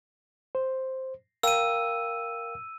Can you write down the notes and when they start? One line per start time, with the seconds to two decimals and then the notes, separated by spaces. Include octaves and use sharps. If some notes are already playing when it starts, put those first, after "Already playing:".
0.55 C5
1.43 A#4 F5 G5 E6 D#7